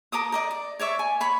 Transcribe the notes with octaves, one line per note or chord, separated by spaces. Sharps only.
A4 A#4 D6 D#6
A#4 D5 D#5
D5
C#5 D5 E5 C#6
G#5
C#5 B5 C#6